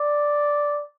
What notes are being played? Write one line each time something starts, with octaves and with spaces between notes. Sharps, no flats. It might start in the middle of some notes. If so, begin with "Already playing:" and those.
Already playing: D5